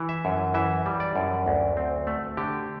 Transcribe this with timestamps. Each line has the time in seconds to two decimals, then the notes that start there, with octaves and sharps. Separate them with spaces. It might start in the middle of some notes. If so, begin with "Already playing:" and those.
Already playing: E3
0.09 E5
0.25 F#2
0.54 E3 E5
0.86 G3
1.00 D5
1.16 F#2
1.46 D2
1.77 C4
2.07 A3
2.37 D3 G4